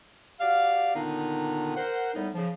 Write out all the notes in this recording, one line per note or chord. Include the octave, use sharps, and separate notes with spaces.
F#4 G4 D5 F5
A#2 D3 D#3 B3 D4 D#4
A#4 C5 F#5
A2 G3 B3 D#4
C#3 F3